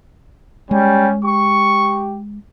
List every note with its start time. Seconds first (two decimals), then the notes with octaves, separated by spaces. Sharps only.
0.71 G3 G#3 C#4
1.25 G4 C#6